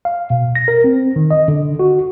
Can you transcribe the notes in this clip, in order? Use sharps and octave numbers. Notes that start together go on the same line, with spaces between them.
F5
B2
A#6
A#4
C4
D#3
D#5
D3
F#4